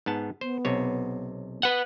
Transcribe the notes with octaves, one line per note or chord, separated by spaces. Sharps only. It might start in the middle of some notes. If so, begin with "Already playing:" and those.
G#2 B3 A5
B3 C5
B1 C3 C#5
B4 F#5